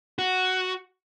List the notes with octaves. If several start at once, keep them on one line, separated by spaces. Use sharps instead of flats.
F#4